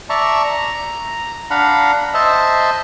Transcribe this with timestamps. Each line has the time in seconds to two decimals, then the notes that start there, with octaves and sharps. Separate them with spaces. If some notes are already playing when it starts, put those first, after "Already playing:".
0.10 D5 E5 A5 A#5 C#6
0.44 A#5
1.51 D4 F5 F#5 A#5 B5
2.14 C5 D#5 E5 A5 E6